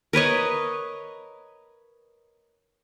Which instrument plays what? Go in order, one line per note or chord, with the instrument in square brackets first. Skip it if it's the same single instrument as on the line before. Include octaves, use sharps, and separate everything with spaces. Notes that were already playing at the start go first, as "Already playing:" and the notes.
[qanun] A#4 B4 C#5 D#5